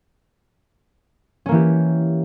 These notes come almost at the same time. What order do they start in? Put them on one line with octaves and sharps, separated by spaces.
C#4 A#3 E3 G4